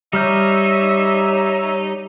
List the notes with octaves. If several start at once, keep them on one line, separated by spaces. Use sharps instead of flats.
G3 D#4 C#5 E5 F6 G6